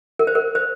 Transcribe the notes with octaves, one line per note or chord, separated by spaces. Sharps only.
A#4
C5
A#4
C5